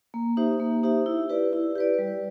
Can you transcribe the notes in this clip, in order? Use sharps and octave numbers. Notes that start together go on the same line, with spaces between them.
A#3
D#4 G4 C5 E5
A#3
D#4 G4 C5 E5
E4
G4 B4 D5
E4
G4 B4 D5
G3